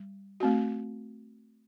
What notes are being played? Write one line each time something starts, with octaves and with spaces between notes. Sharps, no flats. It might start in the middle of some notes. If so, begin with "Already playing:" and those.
Already playing: G3
A3 C4 F#4